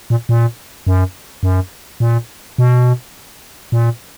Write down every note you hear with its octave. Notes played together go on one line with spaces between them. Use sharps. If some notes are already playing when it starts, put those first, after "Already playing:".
A#2
A#2
F#2
F#2
A#2
B2
A#2